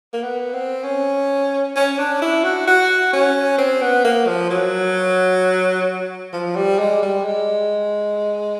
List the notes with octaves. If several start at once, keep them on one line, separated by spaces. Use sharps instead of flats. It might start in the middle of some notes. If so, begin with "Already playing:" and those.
A#3
B3
C4
C#4
C#4
D4
E4
F#4
F#4
C#4
C4
B3
A#3
F3
F#3
F3
G3
G#3
G3
G#3